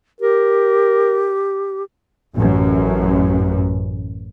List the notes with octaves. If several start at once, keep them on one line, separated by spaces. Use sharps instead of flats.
G4 A#4
A1 F#2